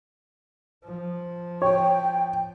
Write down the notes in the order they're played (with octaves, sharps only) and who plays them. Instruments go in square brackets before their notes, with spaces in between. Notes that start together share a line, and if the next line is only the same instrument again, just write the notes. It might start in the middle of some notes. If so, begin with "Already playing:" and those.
[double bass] F3
[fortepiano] C#5 [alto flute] G5